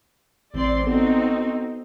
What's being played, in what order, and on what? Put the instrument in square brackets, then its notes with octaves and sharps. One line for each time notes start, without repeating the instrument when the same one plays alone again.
[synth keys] A1 E3 [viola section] C4 D5 C6
[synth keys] B3 A4 [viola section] C4 D#4 F#4